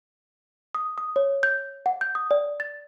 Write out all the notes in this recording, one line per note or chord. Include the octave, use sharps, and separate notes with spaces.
D#6
D#6
C#5
G6
F#5
G6
D#6
D5
A6